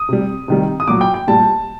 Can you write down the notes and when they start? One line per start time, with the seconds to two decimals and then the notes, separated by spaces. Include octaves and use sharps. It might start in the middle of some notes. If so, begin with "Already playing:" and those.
Already playing: D#6
0.09 C3 G3
0.48 C3 D#3 G3
0.80 D#6
0.88 A#2 F#3 D6
1.01 G5
1.14 G5
1.28 A#2 G3 A5